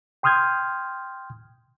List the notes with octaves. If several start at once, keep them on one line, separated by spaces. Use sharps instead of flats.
G5 C6 D#6 F6 G6 G#6